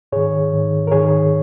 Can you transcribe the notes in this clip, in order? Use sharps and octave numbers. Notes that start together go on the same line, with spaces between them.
G#2 D#3 G#4 C#5
G#2 D#3
A#4
G#2 D#3 G#4 C#5